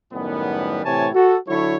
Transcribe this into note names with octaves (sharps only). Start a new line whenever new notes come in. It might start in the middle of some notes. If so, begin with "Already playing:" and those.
F#2 A2 D#3 G3 B3
A2 C3 E3 C#5 G#5 A5
F#4 A4
D3 F#3 E4 A4 C#5